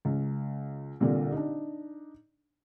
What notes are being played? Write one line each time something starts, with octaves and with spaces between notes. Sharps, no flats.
C#2
C2 A#2 D3 A#3
D4 D#4